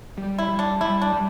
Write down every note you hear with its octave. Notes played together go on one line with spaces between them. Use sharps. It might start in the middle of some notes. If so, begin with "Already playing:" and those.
G3
E4
G3
D4
G3 E4
D4
G3